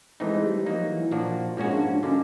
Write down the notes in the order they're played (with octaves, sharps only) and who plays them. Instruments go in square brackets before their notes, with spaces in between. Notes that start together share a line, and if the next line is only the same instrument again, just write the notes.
[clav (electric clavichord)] E3 A3 C4 D#4 [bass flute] G#3
[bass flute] G3
[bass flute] F3 [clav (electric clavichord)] F#3 A#3 D#4
[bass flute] E3
[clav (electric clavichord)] A#2 F3 A#3 D4 F#4
[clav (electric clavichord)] G#2 F3 A#3 C#4 F#4 [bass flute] G#3
[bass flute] D4
D4
[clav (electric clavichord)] D3 G3 A#3 D#4 [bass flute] C#4